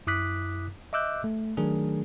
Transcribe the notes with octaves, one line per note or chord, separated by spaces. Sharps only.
F#2 E4 D6 D#6 F#6 B6
D#5 E5 D6 E6 F#6 G6
A3
D#3 F#3 A3 D4 G#4 A#4